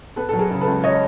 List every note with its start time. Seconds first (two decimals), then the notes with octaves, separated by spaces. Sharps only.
0.16 B3 A4 B4
0.29 F#3 A4
0.39 G#4 A#4
0.51 C#3
0.61 A4 B4
0.68 C#2
0.84 C#5 D#5